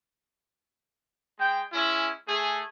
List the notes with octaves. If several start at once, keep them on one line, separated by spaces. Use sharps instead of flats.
G#3 G5
G#3 C#4 E4
A3 G#4